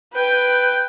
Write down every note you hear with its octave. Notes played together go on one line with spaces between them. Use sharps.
B4 G5